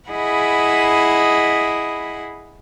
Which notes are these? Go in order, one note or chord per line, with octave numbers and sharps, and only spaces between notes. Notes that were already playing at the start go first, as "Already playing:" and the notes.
E4 G#4 D#5 F#5 B5